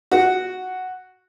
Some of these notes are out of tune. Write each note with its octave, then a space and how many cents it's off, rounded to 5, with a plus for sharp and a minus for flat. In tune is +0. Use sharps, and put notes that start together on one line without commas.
F#4 +0 F#5 +0